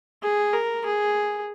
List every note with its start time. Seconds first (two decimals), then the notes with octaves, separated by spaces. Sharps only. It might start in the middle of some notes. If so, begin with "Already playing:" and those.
0.23 G#4
0.53 A#4
0.85 G#4